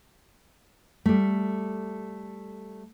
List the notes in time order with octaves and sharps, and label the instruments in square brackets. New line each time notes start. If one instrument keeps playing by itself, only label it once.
[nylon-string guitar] G3 A3